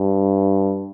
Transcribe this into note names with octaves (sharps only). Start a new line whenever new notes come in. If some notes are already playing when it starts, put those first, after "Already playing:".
Already playing: G2